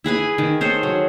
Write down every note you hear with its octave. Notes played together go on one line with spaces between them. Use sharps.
E4 G#4 B4 G#5
D#3
G#4 A4 C5 C#5
F#3